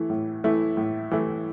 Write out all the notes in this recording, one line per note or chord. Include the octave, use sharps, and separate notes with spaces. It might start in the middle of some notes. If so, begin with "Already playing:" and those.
Already playing: E3 A3 E4
A2
E3 A3 E4
A2
E3 A3 E4